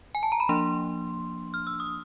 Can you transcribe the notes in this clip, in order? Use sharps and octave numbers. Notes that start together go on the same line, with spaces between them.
G#5
A5
A#5
B5
F3 A#3 D4 C6
F6
E6
D#6